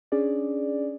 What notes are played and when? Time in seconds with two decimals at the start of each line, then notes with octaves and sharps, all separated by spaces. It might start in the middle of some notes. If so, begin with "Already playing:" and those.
0.12 C#4 D4 G#4 D5